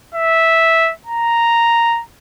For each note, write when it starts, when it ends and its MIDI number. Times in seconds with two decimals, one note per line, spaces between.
0.14 0.92 76
1.07 2.01 82